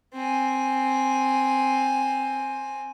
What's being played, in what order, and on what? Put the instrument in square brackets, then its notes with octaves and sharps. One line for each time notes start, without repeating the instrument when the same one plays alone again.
[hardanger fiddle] C4 G#5